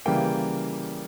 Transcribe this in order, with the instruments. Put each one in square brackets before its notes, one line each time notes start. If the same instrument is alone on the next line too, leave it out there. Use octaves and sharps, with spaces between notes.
[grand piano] C#3 E3 G3 A#3 G5